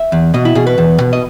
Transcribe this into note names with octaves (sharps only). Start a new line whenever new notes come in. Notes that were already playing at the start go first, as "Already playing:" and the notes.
Already playing: E5
E2
B2 D#5
E4
B2 G#4
B4
E2
B2
D#5